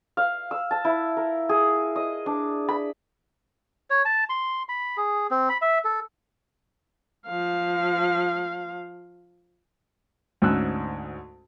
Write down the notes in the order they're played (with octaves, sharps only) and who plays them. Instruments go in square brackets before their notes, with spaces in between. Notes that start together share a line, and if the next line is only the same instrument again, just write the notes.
[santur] F5
E6
A5
E4
A#4
G#4
D#5
D4
B5
[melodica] C#5
A5
C6
B5
G#4
C4
B5
E5
A4
[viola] F3 F5
[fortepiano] D2 G#2 C#4 G#5 E6 F#6